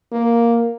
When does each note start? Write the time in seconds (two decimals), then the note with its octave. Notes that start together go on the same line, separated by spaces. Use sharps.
0.12 A#3